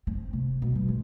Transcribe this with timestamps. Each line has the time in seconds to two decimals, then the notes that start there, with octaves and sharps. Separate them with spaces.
0.07 C4
0.33 C3
0.62 B2
0.75 G3
0.88 G#3